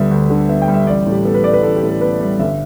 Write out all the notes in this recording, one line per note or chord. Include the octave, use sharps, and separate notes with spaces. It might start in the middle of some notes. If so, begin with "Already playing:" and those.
Already playing: D2 D3 G3 B3 E5
D2
D3
B3 E5
G5
G3
E5
A1 D5
A2
G4
B3 A4
B4
G3 D5
B4
A1 A4
G4
A2
A4
B3 B4
G3
G1 E5